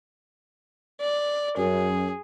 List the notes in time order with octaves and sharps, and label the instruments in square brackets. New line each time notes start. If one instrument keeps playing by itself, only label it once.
[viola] D5
[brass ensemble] F#2 [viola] G#4